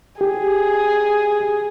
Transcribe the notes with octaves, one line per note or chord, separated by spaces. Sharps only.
G4 G#4